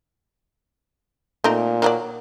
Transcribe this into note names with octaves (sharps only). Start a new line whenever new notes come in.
A#2 A3 C4 D#4
D#3 F#3 D5